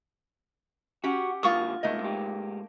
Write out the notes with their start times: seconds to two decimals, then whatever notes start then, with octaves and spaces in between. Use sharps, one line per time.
1.04 C#4 F#4 G4 F#5
1.43 F#2 D3 A#3 F4 C#6 D#6
1.83 C2 G#2 A3 A#3 D#5
2.00 G#2 G4